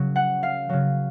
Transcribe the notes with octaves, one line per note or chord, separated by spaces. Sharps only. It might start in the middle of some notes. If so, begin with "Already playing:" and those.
Already playing: C#3 F#3
F#5
F5
C#3 F#3